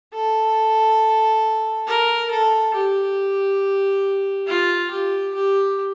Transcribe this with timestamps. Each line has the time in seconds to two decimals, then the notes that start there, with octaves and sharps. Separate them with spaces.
0.13 A4
1.87 A#4
2.31 A4
2.74 G4
4.47 F4
4.90 G4
5.34 G4